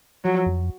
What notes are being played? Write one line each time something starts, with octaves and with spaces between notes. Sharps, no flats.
F3 F#3
F2